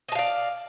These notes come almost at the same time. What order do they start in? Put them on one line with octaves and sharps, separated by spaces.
D#5 A5 F5 D5